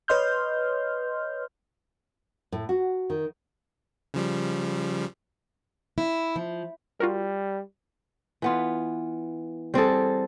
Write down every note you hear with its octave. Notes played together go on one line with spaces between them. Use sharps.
B4 C#5 D#5 C6 F6 G6
A2
F#4
D#3
C#3 F3 G3
E4
F3
G3 F4 F#4 A#4
E3 B3 F4
G3 C4 G#4 A4